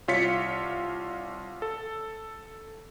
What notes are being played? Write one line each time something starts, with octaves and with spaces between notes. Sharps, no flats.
C2 F4 C#5 B6 C#7
A4